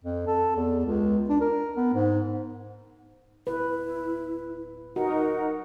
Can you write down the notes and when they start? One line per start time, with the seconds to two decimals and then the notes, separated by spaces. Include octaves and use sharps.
0.04 F2
0.27 A4
0.56 E2
0.85 C#2
1.29 D4
1.41 A#4
1.76 B3
1.93 G#2
3.47 D1 E4 B4
4.96 D#4 F#4 A#4 F#5